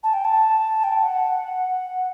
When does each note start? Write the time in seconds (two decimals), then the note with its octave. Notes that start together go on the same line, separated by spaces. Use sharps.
0.03 A5
0.13 G5
0.25 A5
0.84 G5
1.03 F#5